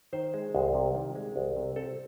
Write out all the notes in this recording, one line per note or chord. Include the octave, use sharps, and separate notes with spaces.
D#3 C5
G#3
C2
C3
D#3
G#3
C2
C3
C4 A4